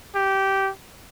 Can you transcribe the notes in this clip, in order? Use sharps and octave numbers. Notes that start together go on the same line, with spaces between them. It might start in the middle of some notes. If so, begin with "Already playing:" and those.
G4